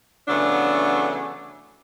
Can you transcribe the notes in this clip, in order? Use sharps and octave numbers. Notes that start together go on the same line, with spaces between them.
C#3 E3 F#3 A3 B3 D4